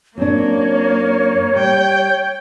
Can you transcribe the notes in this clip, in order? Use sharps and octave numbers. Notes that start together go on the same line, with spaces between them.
F#2 A#3 C4 D4 C#5
G3 G5